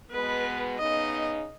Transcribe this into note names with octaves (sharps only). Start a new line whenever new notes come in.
B2 G#3 B3 B4
C#3 B3 D#4 D#5